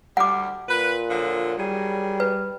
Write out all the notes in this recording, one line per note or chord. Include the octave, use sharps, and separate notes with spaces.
D2 G3 F#5 D6
A#2 B4
D3 F3 F#3
D#3 F#3 G3 G#4
B4